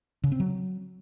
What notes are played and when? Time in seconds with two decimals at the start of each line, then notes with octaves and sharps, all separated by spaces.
0.24 C#3
0.32 C4
0.40 F#3